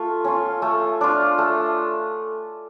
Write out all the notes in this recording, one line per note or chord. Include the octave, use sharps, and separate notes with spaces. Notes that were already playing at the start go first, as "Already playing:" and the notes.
Already playing: A3 F4
C#4 F4
A3
D4 F4
A3